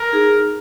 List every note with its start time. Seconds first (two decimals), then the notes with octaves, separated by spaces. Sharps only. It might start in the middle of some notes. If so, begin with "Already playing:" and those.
Already playing: A#4
0.13 D#4 G#4